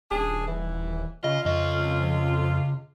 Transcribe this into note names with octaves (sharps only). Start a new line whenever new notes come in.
D#1 D4 G#4
E3
C#3 F4 D#5
F2 C#3 D#5